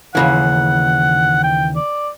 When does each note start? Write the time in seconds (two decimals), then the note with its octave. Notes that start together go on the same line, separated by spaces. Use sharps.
0.15 D#2 C#3 E3 F#5
1.44 G5
1.76 D5